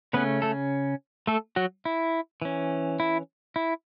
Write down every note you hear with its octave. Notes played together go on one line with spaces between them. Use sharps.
C#3 A3 B3 C#4 B4
A3 A4
A3 A4
F#3 F#4
E4
E3 C#4
E4
E4